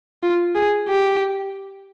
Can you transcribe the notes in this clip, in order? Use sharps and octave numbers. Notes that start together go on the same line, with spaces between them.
F4
G#4
G4